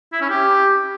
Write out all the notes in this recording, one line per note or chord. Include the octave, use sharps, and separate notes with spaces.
E4
C#4
G4